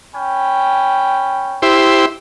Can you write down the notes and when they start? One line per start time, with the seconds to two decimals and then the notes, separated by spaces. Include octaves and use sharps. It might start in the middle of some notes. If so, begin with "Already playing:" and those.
0.14 C#4 G5 B5
1.62 E4 G4 C5